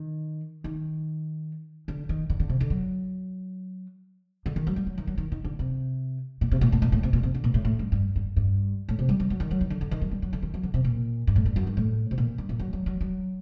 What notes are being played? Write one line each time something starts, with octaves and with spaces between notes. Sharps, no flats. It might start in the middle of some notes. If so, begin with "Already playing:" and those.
Already playing: D#3
D#3
D3
D#3
D3
D3
C3
D3
F#3
D3
D#3
F#3
G3
F#3
D#3
F#3
D#3
D#3
D3
C3
A#2
C3
A#2
A2
A#2
A2
C3
A#2
C3
D3
A#2
A2
A2
G2
G2
G2
G2
A2
C3
G3
G3
F#3
D#3
F#3
D#3
D3
D3
D#3
F#3
G3
F#3
D3
D#3
F#3
D3
C3
A#2
G2
A2
G2
F#2
G2
A2
C3
A#2
G2
A#2
F#3
F#3
F#3
F#3